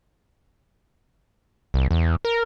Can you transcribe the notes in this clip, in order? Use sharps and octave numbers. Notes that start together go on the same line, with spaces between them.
C2
E2
A#4